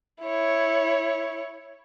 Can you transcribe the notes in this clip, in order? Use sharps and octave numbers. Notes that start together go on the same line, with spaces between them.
E4 C#5